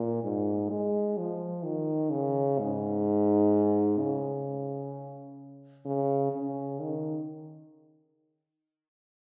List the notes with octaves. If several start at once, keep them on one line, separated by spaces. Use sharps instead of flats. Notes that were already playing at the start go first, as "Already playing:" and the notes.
Already playing: A#2
G#2
G#3
F3
D#3
C#3
G#2
C#3
C#3
C#3
D#3